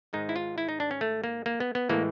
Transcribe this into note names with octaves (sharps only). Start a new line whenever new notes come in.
G#2 D#3 G#3 D#4
E4
F4
E4
D#4
D4
C#4
A3
A#3
A#3
B3
B3
A2 E3 G#3 A#3